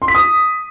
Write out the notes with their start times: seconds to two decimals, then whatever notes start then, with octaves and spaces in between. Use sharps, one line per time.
0.02 C6
0.08 B6
0.15 D#6